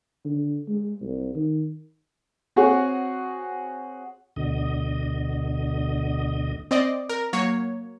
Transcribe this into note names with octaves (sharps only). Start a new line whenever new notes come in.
D3
G#3
C2
D#3
C4 F#4 G#4 C#5 F#5
D2 B2 D3 D#5
C4 D5 D#5
A#4
F#3 A#3 C#5